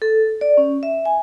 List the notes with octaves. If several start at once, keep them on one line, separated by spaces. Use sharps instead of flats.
A4
D5
C#4
E5
G#5